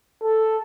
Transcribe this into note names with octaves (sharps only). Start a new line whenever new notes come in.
A4